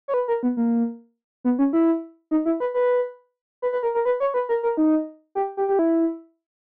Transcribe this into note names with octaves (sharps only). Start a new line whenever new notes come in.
C#5
B4
A#4
B3
A#3
B3
C#4
E4
D#4
E4
B4
B4
B4
B4
A#4
A#4
B4
C#5
B4
A#4
A#4
D#4
G4
G4
G4
E4